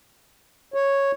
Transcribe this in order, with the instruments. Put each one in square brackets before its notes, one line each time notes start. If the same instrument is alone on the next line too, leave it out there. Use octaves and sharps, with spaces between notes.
[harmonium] C#5